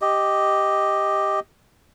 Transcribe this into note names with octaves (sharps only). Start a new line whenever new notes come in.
G4 D#5